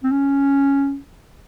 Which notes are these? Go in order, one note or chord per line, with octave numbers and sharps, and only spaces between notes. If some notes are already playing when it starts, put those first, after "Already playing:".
C4
C#4